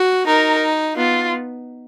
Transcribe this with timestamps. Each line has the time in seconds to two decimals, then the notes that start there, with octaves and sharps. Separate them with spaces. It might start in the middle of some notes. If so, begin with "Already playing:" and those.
Already playing: F#4
0.26 D#4 A#4
0.96 B3 F4